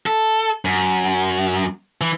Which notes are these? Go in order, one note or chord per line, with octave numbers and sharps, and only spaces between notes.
A4
F#2
E3